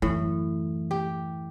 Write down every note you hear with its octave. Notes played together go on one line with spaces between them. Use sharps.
F#2 A2 E3
G4